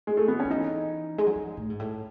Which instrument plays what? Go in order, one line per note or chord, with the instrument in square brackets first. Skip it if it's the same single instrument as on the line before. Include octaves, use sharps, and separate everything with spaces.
[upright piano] G#3
A3
B3
C#4
[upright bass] D#3
[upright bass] E3 [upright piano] D#4
[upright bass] G#3
F#3
E3
A2
G#2
A2